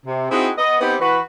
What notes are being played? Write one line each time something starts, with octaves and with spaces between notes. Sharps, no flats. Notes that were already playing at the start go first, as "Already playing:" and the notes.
C3
C4 D#4 E4 F#4 G#4
B3 D#5
B3 C4 D#4 G4
E3 F#4 B4